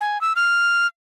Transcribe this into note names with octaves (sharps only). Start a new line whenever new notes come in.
G#5
E6
F6